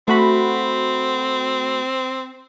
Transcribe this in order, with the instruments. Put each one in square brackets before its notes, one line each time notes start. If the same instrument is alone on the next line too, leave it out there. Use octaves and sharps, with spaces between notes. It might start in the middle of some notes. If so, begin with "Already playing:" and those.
[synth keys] A3 F#4 B5 [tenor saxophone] C4